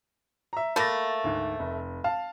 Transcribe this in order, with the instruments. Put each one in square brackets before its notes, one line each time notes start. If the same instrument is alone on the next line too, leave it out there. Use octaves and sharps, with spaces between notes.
[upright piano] E5 A#5
[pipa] A3 A#3 [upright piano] B5 A6 A#6
[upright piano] D2 G#2
F1
F5 A5